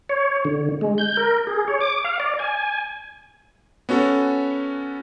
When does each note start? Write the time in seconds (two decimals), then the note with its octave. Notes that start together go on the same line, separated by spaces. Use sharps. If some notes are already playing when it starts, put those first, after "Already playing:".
0.09 C#5
0.45 D3
0.81 G#3
0.98 G6
1.17 A#4
1.47 G#4
1.68 C#5
1.81 D6
2.04 F5
2.20 D5
2.39 G#5
3.89 B3 C#4 F#4 A4